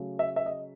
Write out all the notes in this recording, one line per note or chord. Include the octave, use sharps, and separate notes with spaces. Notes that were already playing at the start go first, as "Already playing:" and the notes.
Already playing: C#3 F#3 A3
E5
E5
D#5